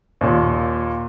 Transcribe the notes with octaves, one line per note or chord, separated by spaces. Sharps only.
D#2 A#2